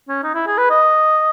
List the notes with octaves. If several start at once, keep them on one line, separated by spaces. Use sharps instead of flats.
C#4
D#4
E4
G#4
B4
D#5